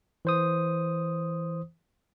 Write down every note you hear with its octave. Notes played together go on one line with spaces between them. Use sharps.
E3 C5 D#6